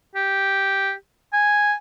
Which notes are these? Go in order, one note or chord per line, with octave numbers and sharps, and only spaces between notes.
G4
G#5